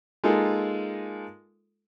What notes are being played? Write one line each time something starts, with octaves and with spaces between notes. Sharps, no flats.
G#3 A#3 D#4 F4 G#4 A4